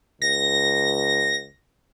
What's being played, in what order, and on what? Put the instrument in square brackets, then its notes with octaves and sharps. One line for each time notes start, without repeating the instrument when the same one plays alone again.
[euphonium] C#2 [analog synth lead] A#6